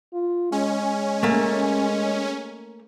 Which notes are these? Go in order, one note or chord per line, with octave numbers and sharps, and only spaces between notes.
F4
G#3 C#4
A3 A#3